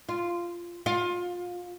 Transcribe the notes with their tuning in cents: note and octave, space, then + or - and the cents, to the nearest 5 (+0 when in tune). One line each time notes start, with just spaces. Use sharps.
F4 -10
F4 +25